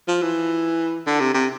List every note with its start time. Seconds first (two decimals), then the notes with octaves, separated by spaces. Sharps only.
0.08 F3
0.22 E3
1.07 D3
1.20 C3
1.34 C3